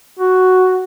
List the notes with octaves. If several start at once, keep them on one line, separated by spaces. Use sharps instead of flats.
F#4